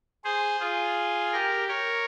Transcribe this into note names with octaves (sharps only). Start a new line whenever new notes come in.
G#4 C5
F4 G#4
G4 A#4
A#4 C#5